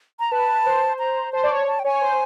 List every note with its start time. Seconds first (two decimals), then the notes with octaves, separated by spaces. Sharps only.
0.20 A#5
0.32 B4 A5
0.66 C5
0.99 A#5
1.33 C5 A5
1.43 D5
1.50 C#5
1.67 A5
1.79 G5
1.85 C#5 G#5
2.01 C5